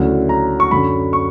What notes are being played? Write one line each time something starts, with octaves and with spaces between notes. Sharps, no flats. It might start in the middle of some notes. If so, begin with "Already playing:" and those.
Already playing: D2 C#3 F#3 C#4 E4
A#5
C#6
F#2 D3 F#3 B5
C#6